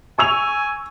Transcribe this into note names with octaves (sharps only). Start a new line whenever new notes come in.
G#5 C#6 E6 F7